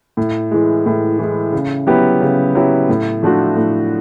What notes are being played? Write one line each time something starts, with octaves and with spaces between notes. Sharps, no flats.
A2
E3 G#3
A2
E3 G#3
C#3
F#3 B3 E4 G4
C#3
F#3 B3 E4 G4
A2
F3 A3 D4 F#4
A2